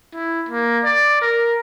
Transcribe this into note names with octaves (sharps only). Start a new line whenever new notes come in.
E4
A#3
D5
A#4